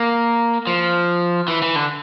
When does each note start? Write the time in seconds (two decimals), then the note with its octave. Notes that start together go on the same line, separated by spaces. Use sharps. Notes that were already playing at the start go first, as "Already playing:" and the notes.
Already playing: A#3
0.67 F3
1.48 E3
1.62 E3
1.76 D3